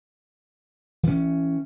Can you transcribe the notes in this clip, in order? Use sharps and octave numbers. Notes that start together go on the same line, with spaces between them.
E3 C#4